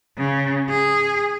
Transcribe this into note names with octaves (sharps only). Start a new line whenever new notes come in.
C#3
G#4